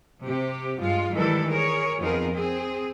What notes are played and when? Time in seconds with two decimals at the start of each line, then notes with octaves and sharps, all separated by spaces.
0.24 C3 G4
0.78 G2 G#3 F4
1.11 D#3 E3 G3 G#3 E4 A4
1.50 G#4 A#4 C#5
1.99 F2 B3 D#4 F4 G#4 A#4
2.34 C4 G#4